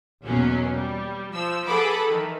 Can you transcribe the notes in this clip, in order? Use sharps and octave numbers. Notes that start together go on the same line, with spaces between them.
E2 B2 F#3 A#3 C#4
G3
F3 E6
G#4 A4 B4 F#5 B5 D6
D#3 E3